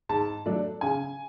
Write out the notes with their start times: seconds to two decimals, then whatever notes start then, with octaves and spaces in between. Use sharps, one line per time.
0.09 G#2 A5
0.46 F#3 A3 D4
0.81 C#3 G#5